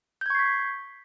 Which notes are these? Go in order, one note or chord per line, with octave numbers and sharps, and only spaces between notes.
C#6 G6 G#6 B6 C7